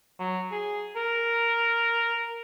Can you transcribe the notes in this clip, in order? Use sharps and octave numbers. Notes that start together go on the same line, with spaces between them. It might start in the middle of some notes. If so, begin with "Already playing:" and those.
F#3
G#4
A#4